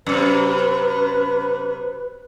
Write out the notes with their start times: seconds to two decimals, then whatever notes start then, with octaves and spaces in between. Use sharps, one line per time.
0.07 F#2 C3 B4